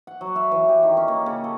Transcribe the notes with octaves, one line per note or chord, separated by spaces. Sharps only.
F#5
F#3
E5
E3
G4
D#3
C#4
A#3
C#3
A4